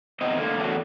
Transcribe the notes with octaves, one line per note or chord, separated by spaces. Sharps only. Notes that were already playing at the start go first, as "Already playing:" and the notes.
E3 B3 C4 D#4 C5 D#5
D3 A3 A#3
E2 A2 A3 C#4 D4 F#4